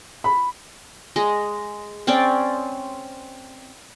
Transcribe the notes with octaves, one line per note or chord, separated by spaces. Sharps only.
B5
G#3 D#5
C4 C#4 C#5 D5